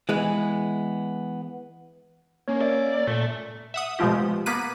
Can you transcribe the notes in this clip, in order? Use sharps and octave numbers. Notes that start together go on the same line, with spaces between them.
E3 G#3 B3
A#3 C#4 C#5
D5 E5
A#2 A3
E5 F#5 D#6
B2 F3 G#3 A3 F4 G4
A#3 B3 D6 F#6 B6 D#7